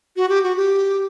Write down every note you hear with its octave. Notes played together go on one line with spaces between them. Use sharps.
F#4
G4
F#4
G4